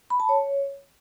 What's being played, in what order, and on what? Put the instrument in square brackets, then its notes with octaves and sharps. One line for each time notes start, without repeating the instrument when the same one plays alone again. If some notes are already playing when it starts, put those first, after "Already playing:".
[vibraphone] B5
A5
C#5